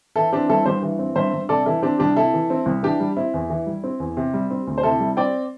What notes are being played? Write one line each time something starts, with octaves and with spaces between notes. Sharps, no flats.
E3 E4 A4
C4 D4 G4
G2 E4 A4
G2 G4 C5
E3
C4
G2 C5 E5
G2
C3 A4 D5
E3 E4 A4
C4 D4 G4
C2 D4 G4
C3 E4 A4
E3
C4
C2
E3 D4 G4
G3
C4 E4
E2
E3
G3
C4
E2
C3
G3
C4
D2
C5
C3 E4 A4
G3
C4 D5 G5